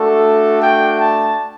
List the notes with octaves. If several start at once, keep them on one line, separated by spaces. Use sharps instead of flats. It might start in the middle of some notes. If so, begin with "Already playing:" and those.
Already playing: A3 D4 F#4 A4
G5
A5